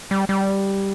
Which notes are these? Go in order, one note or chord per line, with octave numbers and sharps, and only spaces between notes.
G3
G3